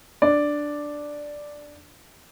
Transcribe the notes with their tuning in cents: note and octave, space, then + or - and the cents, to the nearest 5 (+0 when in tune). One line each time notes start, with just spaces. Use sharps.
D4 +0 D5 +0